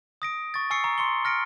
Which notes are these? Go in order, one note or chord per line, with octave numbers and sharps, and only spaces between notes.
D#6 A#6 D7
C#6 A6
G#5 C#6 E6 C7 C#7
A#5 C#6
C6 C#7 G7
F6 A#6 C#7 D7